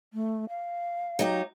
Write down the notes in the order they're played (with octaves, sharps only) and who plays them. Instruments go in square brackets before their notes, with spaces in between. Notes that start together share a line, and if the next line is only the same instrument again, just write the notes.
[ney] A3
F5
[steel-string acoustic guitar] F#3 D#4 G4